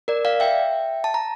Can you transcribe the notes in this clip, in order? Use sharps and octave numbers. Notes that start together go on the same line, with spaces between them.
A#4 D5
D5 F5
E5 G5
A5
A#5